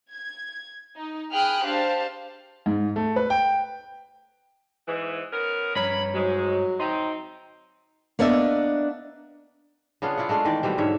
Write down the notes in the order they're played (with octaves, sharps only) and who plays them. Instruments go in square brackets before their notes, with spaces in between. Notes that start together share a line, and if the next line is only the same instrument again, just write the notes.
[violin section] G#6
D#4
G#4 G5 B5 D#6 F6 F#6
D4 G4 C5 F5 A5
[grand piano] G#2
A3
B4
G5
[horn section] G#2 E3
B3 C#4 A#4
[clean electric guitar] G2 C#5 A#5 [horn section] B5
[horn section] G#2 G#3 [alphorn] F#3
[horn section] C4 D#4 [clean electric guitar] G5 A#5 C6
[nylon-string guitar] A#3 B3 D4 D#5 E5
[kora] C#3 B3 D4 F4
E4 F4 D5 F#5
G#3 A3 D4 F4
D#3 E3 D5
B2 E3 G3 C4
G#2 D3 C#5 E5